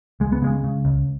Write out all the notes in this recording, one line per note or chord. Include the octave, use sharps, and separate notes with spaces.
C#2 G#3
B3
C#3 G#3
C#3
C#2